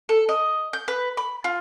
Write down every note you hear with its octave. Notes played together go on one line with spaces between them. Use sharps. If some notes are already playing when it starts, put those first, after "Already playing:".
A4
D#5
G6
B4
B5
F4